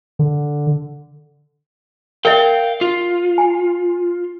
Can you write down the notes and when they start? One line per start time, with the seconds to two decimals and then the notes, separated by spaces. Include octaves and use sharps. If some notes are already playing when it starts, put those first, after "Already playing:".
0.19 D3
2.25 A#4 D5 E5 F5 G5
2.81 F4
3.38 G#5